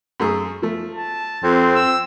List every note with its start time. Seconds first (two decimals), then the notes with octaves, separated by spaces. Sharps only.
0.20 F#2 A3 G#4
0.62 F3 A3
0.95 A5
1.44 F2 C4
1.75 E6